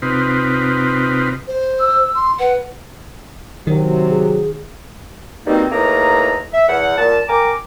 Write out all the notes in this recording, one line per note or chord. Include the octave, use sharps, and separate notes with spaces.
C3 C4 D#4 F4 B4
C5
E6
C6
B4 F#5
C3 D#3 F#3
G#4
B2 D#3 G3 A#3 C4 D#4
A2 A#3 D#4 G#4 B4 A#5
E5
E2 F#5
A#2 A5
A#4 G5 G#5 A#5 D6